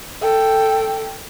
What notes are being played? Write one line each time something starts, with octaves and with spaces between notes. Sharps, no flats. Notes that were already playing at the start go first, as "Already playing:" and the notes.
A4 G5